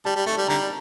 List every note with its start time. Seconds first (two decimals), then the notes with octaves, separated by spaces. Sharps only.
0.05 G3 A5
0.16 G3
0.26 A3 A5
0.37 G3
0.48 D3 G3 A#5